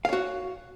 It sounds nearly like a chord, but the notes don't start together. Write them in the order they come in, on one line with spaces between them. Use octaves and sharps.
F5 C#5 F#4